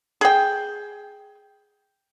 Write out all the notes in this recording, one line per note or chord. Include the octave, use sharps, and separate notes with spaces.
G#4 G5